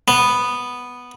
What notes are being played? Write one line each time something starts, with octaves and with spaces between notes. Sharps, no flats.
B3